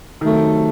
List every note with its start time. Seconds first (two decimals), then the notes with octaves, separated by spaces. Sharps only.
0.21 C3 D#3 F#3 A3